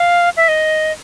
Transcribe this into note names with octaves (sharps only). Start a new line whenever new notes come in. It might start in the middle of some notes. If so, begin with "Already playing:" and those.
Already playing: F5
E5
D#5